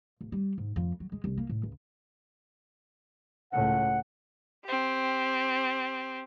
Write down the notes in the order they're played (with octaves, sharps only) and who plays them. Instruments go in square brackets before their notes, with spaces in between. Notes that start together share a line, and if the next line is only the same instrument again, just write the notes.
[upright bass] D1
G3
G#2
F2
F#3
G#3
C2
A#3
A2
C#2
[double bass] C#2 A2 [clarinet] F#5
[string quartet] C4 G4